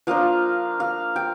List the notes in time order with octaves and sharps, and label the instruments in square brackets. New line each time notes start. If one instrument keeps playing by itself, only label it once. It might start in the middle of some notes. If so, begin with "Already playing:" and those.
[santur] F3 A#3 D4 F5
F5
G5